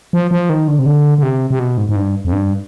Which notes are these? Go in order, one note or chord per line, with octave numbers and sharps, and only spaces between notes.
F3
F3
D#3
D3
C3
D3
D3
C3
C3
B2
G#2
G#2
G2
F2
G2